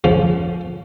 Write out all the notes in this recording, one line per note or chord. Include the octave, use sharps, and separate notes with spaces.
C#3 F3